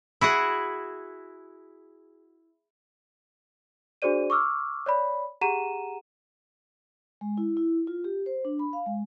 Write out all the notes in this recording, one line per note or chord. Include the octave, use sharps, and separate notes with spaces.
E4 F#4 G#4 F#5
D4 F#4 G#4 C5 D5 D#7
C#6 D6 E6 F6
C#5 D5 B5
G4 G#4 F#5 A#5 D#7 E7
G#3
E4
E4
F4
G4
C5
D4
B5
F5
G#3